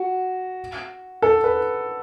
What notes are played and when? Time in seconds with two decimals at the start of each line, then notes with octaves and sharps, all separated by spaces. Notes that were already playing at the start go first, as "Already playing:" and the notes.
Already playing: F#4
1.22 A4
1.44 B4